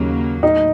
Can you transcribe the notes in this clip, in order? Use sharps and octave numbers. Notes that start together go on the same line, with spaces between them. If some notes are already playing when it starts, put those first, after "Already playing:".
Already playing: D#2 C#3 F#3 A#3
A2 D#4